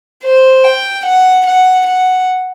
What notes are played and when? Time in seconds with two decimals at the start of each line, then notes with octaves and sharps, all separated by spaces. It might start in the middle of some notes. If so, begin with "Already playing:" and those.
0.24 C5
0.64 G5
1.06 F#5
1.46 F#5
1.87 F#5